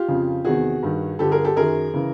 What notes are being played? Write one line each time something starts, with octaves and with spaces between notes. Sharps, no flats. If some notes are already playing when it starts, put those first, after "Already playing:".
Already playing: F4 G4
F2 C#3 F3
E2 C3 D#3 F#4 G#4
G2 D#3
G2 D3 F3 G4 A4
G#4 A#4
G4 A4
F#2 D#3 G#4 A#4
C#3 E3